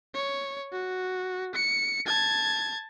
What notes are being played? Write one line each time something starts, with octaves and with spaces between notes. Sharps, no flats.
C#5
F#4
C#7
A5 G#6